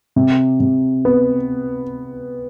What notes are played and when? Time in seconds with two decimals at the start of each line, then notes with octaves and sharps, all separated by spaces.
0.16 C3
0.60 C3
1.05 B3